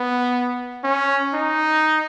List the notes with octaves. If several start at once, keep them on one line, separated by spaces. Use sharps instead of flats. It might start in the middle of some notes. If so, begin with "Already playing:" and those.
Already playing: B3
C#4
D#4